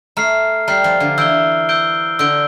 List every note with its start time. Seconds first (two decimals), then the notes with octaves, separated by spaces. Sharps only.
0.17 A3 A#5 F6 C7
0.68 G3 A#5 F6 C7
0.84 F3
1.00 D3
1.18 E3 E6 G6 D7 G7
1.69 E6 G6 D7 G7
2.19 D3 E6 G6 D7 G7